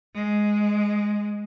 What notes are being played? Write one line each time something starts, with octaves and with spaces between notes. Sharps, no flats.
G#3